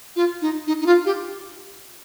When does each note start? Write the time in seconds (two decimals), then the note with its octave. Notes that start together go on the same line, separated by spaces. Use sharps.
0.16 F4
0.41 D#4
0.67 D#4
0.80 D#4
0.86 F4
1.05 G4